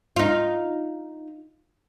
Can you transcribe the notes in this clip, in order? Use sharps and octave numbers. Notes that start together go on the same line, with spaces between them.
D#4 F4